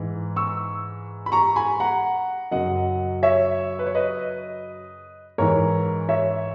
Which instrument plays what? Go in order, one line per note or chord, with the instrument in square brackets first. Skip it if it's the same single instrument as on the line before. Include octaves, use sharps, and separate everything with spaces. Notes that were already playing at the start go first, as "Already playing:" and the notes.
Already playing: [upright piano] G#2 E3
C#6 E6
B5
A#5 C#6
G#5 B5
F#5 A#5
F#2 C#3 F#3 D#5 F#5
C#5 E5
B4
C#5
B4 D#5
G#2 E3 A#4 C#5
C#5 E5